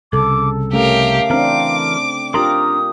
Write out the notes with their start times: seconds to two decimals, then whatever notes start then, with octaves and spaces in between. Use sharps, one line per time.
0.13 C2 C#3 A4 D6
0.73 A3 C#4 G4 A#4 F5
1.30 E3 C4 D4 A#4 D6
2.34 D4 F4 G4 A#4 A#5 C6 D#6